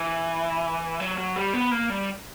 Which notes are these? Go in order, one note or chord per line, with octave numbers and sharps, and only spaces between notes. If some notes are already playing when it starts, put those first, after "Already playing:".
Already playing: E3
F#3
F#3
G3
B3
A#3
G3